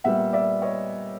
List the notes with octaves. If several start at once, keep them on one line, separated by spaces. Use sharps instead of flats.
A#2 G3 B3 E5 F#5
D5 E5
C#5 D#5